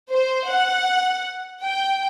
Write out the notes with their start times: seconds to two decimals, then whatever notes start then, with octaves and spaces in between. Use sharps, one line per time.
0.13 C5
0.51 F#5
1.63 G5